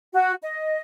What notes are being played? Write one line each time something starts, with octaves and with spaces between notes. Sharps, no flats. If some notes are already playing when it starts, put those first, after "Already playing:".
F#4
D#5